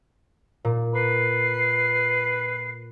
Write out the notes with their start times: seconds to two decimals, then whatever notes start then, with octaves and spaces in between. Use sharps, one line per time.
0.65 A#2
0.95 B4 C7